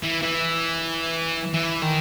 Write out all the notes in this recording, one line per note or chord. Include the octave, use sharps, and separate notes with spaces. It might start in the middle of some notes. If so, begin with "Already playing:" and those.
E3
E3
E3
D#3